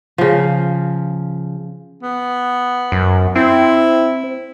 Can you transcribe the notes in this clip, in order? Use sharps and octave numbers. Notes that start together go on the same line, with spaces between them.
C#3 F3
B3
F#2
C4 E4